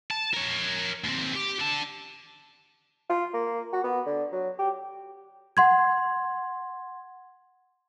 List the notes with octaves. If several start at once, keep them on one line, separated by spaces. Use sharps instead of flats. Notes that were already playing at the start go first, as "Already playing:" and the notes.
A5
A#4 C#5
D#2 C4
G4
D3 A5
F4
A#3
F#4
B3
D3
F#3
G4
F#5 C6 G#6